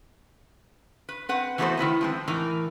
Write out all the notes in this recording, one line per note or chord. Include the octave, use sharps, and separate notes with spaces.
B4
C4 B4 F#5
E3 A3 B3 F#4 A4 C5
D#3 E4 B4 D#5
F3 G#3 C4
A2 E3 D#4 A#4